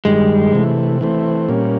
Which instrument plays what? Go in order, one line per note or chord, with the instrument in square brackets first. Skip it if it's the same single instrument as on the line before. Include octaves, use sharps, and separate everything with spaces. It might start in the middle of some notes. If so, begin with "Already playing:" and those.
[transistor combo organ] G2 D#3 G3 [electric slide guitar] G#3
[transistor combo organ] C3 E3 A3
E3 A3 C4
A#2 G3 A#3 C#4